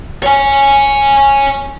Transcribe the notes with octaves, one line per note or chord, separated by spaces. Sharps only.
C#5 G#5